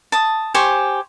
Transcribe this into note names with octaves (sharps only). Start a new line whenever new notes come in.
A5 D#6
G4 C5 G#5 C#6